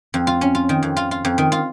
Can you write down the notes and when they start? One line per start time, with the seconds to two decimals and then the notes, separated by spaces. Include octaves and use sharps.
0.14 F2
0.27 F4
0.41 C#4
0.55 F4
0.69 D#3
0.83 F2
0.97 F4
1.11 F4
1.25 F2
1.38 D#3
1.52 F4